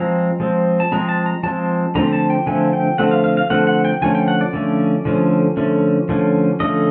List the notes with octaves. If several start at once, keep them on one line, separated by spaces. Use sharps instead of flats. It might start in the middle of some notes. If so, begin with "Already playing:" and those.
Already playing: F3 G#3 C4 A#5
F3 G#3 C4
A5
F3 G#3 C4 A#5
A5
A#5
F3 G#3 C4 A5
D3 F3 A3 C4 A#5
A5
G5
D3 F3 A3 C4 G#5
G5
D3 F3 A3 C4 F#5
F5
F5
F5
D3 F3 A3 C4 F#5
F#5
G5
D3 F3 A3 C#4 G#5
G5
F#5
D5
D3 F3 A3 C#4
D3 F3 A3 C#4
D3 F3 A3 C#4
D3 F3 A3 C#4
D3 F3 A3 C#4 D#5